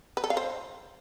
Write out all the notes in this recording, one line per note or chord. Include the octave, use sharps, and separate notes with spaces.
B4
A4
F5
C5